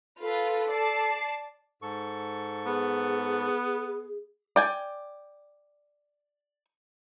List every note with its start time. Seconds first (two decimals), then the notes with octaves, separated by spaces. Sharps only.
0.21 F4 A4 B4
0.71 D5 A5 C7
1.82 G#2 A4 C#6
2.66 B3 G#4
4.56 D5 G5 G#5